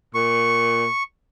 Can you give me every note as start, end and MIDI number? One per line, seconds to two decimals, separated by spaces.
0.14 0.87 46
0.14 1.03 85